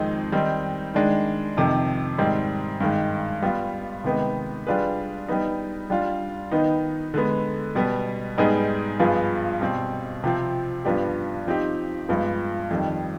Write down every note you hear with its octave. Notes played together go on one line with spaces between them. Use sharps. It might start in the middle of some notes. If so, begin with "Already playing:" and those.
Already playing: F2 D#3 G#3 C4 D#4
D#3 G3 C4 D#4
D#3 G#3 D4
F2 C3 D#3
G#2 D#3 G3 C4
G2 D#3 G#3
G3 B3 F4 B4
C3 D#3 G#3 B3 D#4
G3 D4 F4 G#4 B4
G3 B3 D#4
G3 D4 F4
D#3 B3 D#4
D3 G#3 B3
B2 G3 B3
G#2 G3 B3 D#4 G#4
G2 F3 B3 F4 G#4
B2 G3 C4
C3 F3 C4
G2 F3 B3 D4 G4
F3 C4 D#4 G4
G2 F3 G#3 B3
F2 D#3 G3